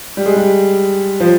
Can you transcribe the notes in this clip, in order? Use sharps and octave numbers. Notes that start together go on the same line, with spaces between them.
G3
G#3
G3
F3